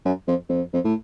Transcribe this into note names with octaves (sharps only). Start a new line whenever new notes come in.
F#2
F2
F2
F2
A2